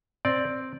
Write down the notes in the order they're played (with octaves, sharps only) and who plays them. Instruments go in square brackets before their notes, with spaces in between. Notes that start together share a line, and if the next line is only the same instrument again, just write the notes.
[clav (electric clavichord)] C4 D5